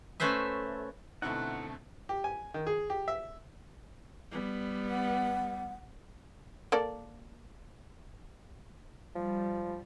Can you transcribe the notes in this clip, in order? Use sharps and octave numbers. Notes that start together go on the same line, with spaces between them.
A3 C#4 B4 C5 E5
B2 D3 A3 C4 D#4 E4 F#5
G4
G#5
D#3
G#4
G4
E5
G3 B3
F#5
A#3 A4 D5
F3 G3